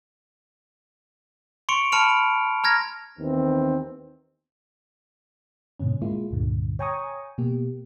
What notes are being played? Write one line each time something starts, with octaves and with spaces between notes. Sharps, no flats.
C6 C#6 C#7 D7 F7
A5 B5 F6 C#7 D7 F7
A#5 F6 G#6 A#6
D#2 D#3 E3 B3 C4
G#2 B2 D3 C#4
G#3 A#3 E4 F4
C#2 G2 A#2 D3
C#5 G5 G#5 A#5 C#6 D#6
B2 A#3 G4